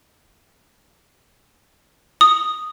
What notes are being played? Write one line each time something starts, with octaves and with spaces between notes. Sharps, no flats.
D#6